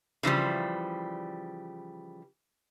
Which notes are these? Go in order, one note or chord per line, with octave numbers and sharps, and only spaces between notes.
C#3 E3 F3 G3